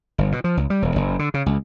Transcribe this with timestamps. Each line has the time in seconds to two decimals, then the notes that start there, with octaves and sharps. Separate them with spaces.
0.18 G1
0.32 B2
0.44 F3
0.57 C#2
0.70 G3
0.82 E1
0.96 F#1
1.19 D3
1.34 C#3
1.46 C#2